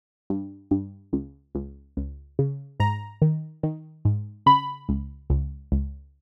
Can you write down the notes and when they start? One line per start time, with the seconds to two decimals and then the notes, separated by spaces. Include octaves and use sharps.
0.30 G2
0.71 G2
1.13 C#2
1.55 C#2
1.97 C#2
2.39 C#3
2.80 G#2 A#5
3.22 D#3
3.63 D#3
4.05 G#2
4.46 C#3 B5
4.89 C#2
5.30 C#2
5.72 C#2